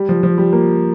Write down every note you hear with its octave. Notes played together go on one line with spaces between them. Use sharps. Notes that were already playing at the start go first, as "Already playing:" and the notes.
Already playing: G3
F3
F3
G3
A#3